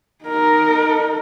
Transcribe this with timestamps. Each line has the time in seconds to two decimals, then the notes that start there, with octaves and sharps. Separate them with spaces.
0.24 D#4 A#4